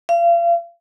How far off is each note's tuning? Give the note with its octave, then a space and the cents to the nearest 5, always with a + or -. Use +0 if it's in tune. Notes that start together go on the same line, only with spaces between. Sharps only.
F5 -35